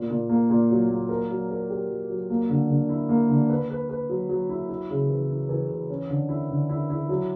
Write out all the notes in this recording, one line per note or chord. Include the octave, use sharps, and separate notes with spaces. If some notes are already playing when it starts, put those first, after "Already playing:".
Already playing: A#2
A#2
A#3
A#2
F#3
A#3
A#4
F#3
A#4
G4
F#3
F#3
A#3
D3
D3
E4
A#3
D3
B4
B4
B4
F#3
F#3
E4
E4
C#3
E3
E4
E3
E3
C#4
D3
E4
D3
E4
E4
F#3